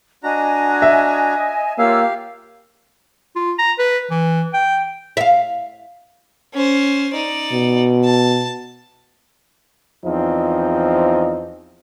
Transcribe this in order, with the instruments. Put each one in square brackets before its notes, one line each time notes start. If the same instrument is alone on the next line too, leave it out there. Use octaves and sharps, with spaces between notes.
[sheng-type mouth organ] D4 F#4 A#5 [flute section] D#5 G#5
[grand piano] E5
[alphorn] A#3 [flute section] F4 C#5 E6 [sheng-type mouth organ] G4 F5
[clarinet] F4
A#5
B4
E3
G5
[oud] E5 F5
[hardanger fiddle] C#4 C5
D#4 D5
[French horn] B2
[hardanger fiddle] A5
[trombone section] E2 F3 C4 D#4